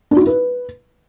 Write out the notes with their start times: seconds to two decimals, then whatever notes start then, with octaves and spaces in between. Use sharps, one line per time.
0.11 D4
0.16 F#4
0.22 E4
0.27 B4